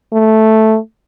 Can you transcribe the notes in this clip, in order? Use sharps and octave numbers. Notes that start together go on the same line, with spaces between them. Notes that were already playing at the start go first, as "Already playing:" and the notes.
A3